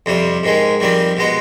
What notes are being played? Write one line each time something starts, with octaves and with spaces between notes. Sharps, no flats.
F2 C3 G3
G#2 D#3 G#3
F2 D#3 G3 C4
B2 G#3 B3